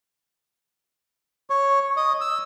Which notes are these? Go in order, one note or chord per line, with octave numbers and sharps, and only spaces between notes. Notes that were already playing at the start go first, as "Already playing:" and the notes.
C#5
D#5
E6